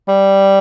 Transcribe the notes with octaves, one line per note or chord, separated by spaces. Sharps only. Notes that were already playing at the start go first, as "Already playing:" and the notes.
G3